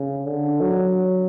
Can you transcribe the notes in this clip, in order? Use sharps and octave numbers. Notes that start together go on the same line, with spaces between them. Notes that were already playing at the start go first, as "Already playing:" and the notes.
Already playing: C#3
D3
F#3